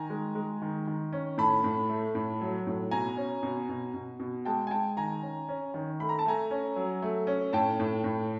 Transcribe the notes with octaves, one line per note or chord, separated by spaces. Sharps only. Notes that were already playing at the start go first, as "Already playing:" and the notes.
Already playing: D#3 G#5 A#5
G#3
G#3
D#3
D#3
C#4
A2 A5 B5
A2
A3
A2
F#3
A2
B2 G#5 A#5
C#4
B2
B2
B2
B2
G#3 G5 A5
G#5
G#3 G5 A5
D#3 G#5 A#5
C#4
C#4
D#3
A3 B5
A#5
A5
A3 G#5 A#5
C#4
F#3
A3
C#4
A2 G5 A5
A2
A2